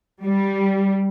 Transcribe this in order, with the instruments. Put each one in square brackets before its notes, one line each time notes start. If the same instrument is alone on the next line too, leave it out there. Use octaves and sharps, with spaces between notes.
[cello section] G3